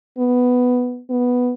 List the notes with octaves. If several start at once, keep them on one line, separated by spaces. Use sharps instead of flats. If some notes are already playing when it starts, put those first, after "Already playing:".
B3
B3